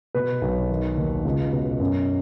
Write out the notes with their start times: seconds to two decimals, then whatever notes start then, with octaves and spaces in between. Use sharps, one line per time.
0.15 B2 B4
0.42 B1
0.69 D#3
0.97 D#2
1.25 C#2
1.53 B2
1.80 F#2